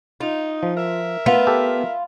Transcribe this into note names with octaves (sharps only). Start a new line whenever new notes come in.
D#4 F4
F3
A#4 E5
B3 F4
G4 A4